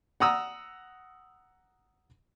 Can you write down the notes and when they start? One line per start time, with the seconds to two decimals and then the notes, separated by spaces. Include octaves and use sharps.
0.20 F#5 A#5 D#6 E6